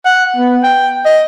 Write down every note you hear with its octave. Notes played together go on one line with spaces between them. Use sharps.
F#5
B3
G5
D#5